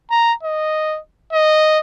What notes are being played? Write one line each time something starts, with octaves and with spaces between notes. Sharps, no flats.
A#5
D#5
D#5